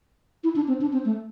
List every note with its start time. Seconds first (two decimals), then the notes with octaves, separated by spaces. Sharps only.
0.44 E4
0.56 D4
0.68 C4
0.81 D4
0.93 C4
1.05 A3